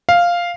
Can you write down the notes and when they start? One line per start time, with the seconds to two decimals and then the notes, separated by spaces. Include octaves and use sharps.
0.09 F5